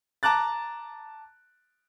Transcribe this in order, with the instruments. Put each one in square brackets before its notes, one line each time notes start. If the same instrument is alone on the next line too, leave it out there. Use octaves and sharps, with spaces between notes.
[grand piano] A5 A#5 D6 F#6 A6